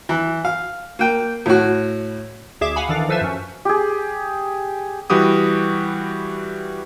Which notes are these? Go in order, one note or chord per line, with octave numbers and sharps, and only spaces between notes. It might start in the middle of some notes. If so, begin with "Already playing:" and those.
E3
F5
A#3 G5
A2 F#4
D2 G#4 E5 D6 E7
F5 F#5 G#5 B5
D#3 E3 D4 A4 F5
F3 A4 B4 C5 E5
F#2 C#4
G4 G#4
E3 G3 F#4 G4 D#6